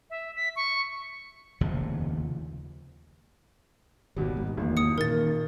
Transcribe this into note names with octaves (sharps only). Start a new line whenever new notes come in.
E5
B6
C#6
F1 D#2 C#3 F3
G#1 D#2 B2 G3
G#2
G#1 E2 E3 A#3
D#6 C#7
A#2 D#3 A#4 A6